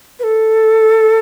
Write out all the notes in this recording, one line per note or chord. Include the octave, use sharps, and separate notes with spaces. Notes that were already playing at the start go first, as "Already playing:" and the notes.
B4
A4